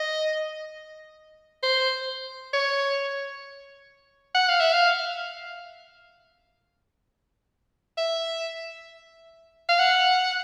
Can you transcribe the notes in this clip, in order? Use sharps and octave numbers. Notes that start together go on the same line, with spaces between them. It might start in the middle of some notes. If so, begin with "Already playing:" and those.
Already playing: D#5
C5
C#5
F#5
F5
E5
F5
E5
F5
F#5